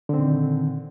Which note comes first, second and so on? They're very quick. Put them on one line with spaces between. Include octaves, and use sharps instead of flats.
D3 C4 A#2 D#3